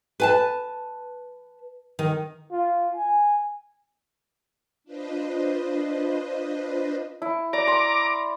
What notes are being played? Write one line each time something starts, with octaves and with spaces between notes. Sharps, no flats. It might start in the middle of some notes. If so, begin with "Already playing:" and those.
B4 G#5 A5
D#3
F4
G#5
D4 F4 B4 C5 D#5
E4
D5 A#5 D6
C6